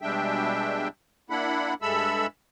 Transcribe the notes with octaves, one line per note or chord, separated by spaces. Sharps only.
B2 G3 G#3 D4 E5 G5
A#3 D4 E4 F#5 B5
G2 G#3 A4 E5 B5 E6